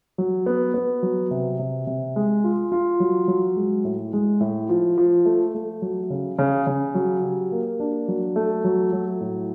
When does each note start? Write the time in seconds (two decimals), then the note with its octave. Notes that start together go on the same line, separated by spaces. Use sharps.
0.18 F#3
0.46 B3
0.74 B3
1.03 F#3
1.31 C3
1.59 C3
1.87 C3
2.16 G#3
2.44 F4
2.72 F4
3.00 F#3
3.28 F#3
3.56 G#3
3.85 A2
4.13 G#3
4.41 A2
4.69 F3
4.98 F3
5.26 A3
5.54 A3
5.82 F#3
6.10 C#3
6.39 C#3
6.67 C#3
6.95 F#3
7.23 G4
7.52 A#3
7.80 D4
8.08 F#3
8.36 A3
8.64 F#3
8.93 F#3
9.21 A2